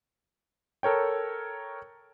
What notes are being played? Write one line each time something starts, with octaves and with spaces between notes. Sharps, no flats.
A4 A#4 C#5 G5